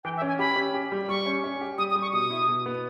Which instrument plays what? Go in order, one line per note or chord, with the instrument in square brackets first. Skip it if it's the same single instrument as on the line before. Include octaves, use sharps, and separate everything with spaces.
[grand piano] E3 [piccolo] G5
[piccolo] E5
[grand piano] C#4
[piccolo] G#5
[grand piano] G4 [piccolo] B5
[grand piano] C#4
G4
G3
[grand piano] G3 [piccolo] C#6
[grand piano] C#4
C#4
G4
[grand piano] G3 [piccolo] D#6
[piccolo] D#6
[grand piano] G3
[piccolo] C#6
[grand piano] B2 [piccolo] D#6
[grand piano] E4
B2
B3